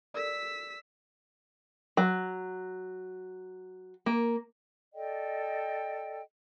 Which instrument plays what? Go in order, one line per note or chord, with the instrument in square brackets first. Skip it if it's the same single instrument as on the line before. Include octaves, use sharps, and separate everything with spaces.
[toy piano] A4 A#4 D5 [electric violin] E6 B6
[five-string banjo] F#3
A#3
[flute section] A4 D5 D#5 G5